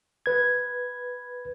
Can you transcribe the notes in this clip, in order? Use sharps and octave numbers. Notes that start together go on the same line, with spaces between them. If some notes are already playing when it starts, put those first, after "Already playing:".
B4 G#6